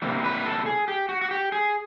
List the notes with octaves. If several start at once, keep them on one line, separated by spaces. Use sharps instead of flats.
C3 E3 G3 A#3
B4
A4
G#4
G4
F#4
F#4
G4
G#4